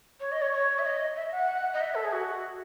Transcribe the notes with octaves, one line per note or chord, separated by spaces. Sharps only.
C#5
D#5
C#5
C#5
E5
D#5
E5
F#5
D#5
E5
A4
G#4
F#4